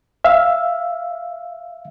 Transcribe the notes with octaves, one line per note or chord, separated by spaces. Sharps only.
E5 F5